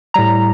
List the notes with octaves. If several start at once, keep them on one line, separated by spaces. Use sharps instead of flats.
A2 G3 A#5